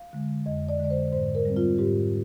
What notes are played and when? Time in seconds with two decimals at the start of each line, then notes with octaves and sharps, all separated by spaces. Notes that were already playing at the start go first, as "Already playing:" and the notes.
Already playing: F5
0.13 D3 G#3
0.46 F2 D#5
0.68 D5
0.80 D3 G#3 D5
0.90 C5
1.13 G#2 C5
1.35 A#4
1.45 G3 C4
1.57 F4
1.78 G#2 G4